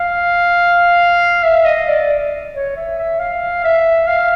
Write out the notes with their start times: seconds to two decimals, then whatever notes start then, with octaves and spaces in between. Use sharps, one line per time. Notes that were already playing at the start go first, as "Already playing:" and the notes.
Already playing: F5
1.44 E5
1.65 D#5
1.88 D5
2.54 C#5
2.76 E5
2.98 E5
3.20 F5
3.64 E5
4.08 F5